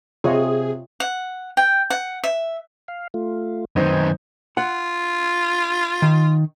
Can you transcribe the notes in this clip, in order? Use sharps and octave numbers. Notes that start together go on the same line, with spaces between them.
C3 F4 G#4 C#5 D#5
F#5
G5
F#5
E5
F5
A3 F4
F#2 D#3 C4 D#4 B4 G#5
F4 F#5
D#3